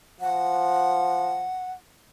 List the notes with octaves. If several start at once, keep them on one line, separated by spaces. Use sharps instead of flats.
F3 F#5